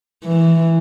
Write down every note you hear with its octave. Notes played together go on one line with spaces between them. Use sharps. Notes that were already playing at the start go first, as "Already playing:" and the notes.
E3